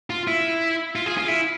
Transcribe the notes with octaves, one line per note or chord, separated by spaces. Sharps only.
F4
E4
F4
G#4
F4
E4